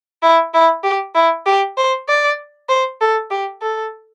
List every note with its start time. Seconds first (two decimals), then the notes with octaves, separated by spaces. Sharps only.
0.23 E4
0.54 E4
0.84 G4
1.15 E4
1.46 G4
1.78 C5
2.09 D5
2.69 C5
3.01 A4
3.31 G4
3.62 A4